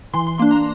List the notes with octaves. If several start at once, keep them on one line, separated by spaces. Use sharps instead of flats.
E3 C6
C6
A#3 D4 C6
A#5